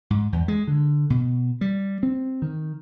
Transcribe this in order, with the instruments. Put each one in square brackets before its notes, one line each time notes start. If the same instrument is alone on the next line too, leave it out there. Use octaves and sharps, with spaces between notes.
[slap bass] G#2
E2
G#3
D3
B2
G3
C4
D#3